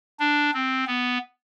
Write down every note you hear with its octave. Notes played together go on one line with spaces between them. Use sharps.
D4
C4
B3